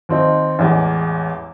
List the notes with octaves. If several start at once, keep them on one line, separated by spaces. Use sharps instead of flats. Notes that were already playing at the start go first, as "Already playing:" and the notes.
D#2 C4 D#4
A1 E2 G#3